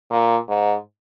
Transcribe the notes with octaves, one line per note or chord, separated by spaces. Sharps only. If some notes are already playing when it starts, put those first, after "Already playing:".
A#2
G#2